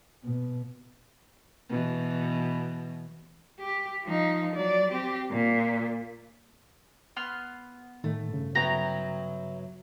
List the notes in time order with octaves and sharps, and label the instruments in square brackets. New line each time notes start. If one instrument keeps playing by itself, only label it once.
[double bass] B2
[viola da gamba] B2 E3
[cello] G4
F3 D#4
F#3 D5
C4 G4
A#2
[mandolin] B3 C6 F6
[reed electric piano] A2 D#3 [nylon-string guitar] A3
[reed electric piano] G2 C#3
[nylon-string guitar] F#3 B3 [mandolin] E4 G5 A#5